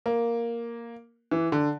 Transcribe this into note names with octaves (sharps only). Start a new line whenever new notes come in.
A#3
E3
D3